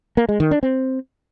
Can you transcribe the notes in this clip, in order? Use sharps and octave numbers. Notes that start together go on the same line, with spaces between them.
A#3
G#3
D#3
D4
C4